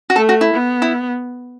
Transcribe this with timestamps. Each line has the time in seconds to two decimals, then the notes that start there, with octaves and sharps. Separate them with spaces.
0.10 F#4
0.16 A3 A4
0.29 F#4
0.41 E4
0.53 B3
0.82 E4